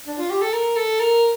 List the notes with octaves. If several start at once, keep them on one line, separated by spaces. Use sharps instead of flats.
D4
F4
G4
A4
A#4
A4
A#4